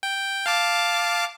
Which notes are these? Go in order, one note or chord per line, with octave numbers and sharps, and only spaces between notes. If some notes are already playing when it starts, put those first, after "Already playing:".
G5
F5 A5 D6